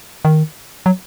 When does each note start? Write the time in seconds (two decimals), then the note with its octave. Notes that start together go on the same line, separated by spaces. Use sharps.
0.25 D#3
0.86 F#3